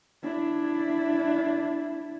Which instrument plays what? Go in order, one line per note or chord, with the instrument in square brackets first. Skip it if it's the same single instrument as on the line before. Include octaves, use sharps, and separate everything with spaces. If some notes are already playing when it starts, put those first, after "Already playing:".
[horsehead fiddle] D4 E4